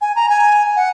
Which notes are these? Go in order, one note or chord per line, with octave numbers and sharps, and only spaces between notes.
G#5
A#5
G#5
F#5